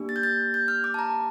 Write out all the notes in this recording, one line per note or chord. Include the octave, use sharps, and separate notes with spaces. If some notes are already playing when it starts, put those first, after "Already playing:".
Already playing: A#3 D4 G4
A6
G6
A6
G6
F6
D6
A5
A#5